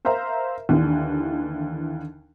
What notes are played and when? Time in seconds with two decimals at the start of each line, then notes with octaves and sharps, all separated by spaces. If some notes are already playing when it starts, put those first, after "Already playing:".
0.05 A#4 C5 E5 F5 A#5
0.69 D#2 D3 E3